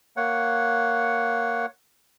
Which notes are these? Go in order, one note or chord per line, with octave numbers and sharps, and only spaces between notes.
A#3 C#5 F#5